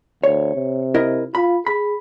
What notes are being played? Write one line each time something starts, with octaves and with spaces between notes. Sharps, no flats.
D2 C#5
C3
E4 A#4 D#5
F4 B5
G#4 B5